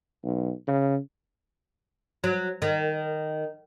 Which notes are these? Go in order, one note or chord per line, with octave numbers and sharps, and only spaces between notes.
B1
C#3
F#3
D#3